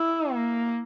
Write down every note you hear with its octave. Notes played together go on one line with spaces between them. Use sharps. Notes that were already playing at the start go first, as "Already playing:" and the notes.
Already playing: E4
A#3